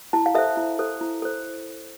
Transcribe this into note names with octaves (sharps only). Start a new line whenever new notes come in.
E4 A5
F5
A4 C5 E5
E4
A4 C5
E4
A4 C5